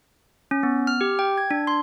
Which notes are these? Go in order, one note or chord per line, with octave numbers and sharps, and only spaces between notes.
C#4
B3
F6
G4
G5
G#6
D4
C6